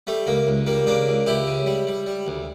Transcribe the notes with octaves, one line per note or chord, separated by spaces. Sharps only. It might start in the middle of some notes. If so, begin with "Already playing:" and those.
G3 A3
C#2 A#3
C#2
G3 A#3
C#3 A#3 D4
C#2
C#2 E4 G4
C#3
G3
G3
G3
D2